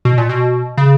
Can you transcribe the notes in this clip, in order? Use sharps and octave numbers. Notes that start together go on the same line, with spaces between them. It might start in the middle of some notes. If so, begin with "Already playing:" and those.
B2
A#2
B2
C#3